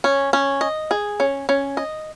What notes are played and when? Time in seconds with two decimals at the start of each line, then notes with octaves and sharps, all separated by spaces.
0.04 C#4
0.33 C#4
0.61 D#5
0.91 G#4
1.20 C#4
1.49 C#4
1.77 D#5